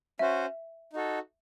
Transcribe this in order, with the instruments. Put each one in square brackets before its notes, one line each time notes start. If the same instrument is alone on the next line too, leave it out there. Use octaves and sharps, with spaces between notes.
[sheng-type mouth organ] C#4 F#4 C5 [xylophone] E5
[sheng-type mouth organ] D#4 F#4 A4